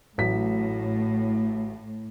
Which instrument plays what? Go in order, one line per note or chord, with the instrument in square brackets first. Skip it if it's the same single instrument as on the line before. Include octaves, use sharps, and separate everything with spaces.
[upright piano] A1 F#3 B6 [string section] A2